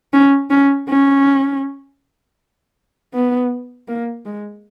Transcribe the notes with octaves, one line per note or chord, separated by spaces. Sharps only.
C#4
C#4
C#4
B3
A#3
G#3